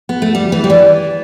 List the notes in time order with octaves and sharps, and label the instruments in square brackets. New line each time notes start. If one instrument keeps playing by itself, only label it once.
[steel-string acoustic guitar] B3
A3
G3
E3
G3
[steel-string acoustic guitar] E3 [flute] D5